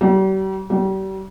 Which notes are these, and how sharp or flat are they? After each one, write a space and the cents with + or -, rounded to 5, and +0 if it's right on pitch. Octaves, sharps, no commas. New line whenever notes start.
G3 -40
G3 -35